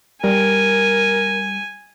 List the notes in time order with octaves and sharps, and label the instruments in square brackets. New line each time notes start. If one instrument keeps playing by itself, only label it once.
[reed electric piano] G3 [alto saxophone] A#4 [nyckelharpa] G#5